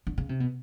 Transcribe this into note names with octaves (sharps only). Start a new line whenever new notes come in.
D3
C#3
C3
B2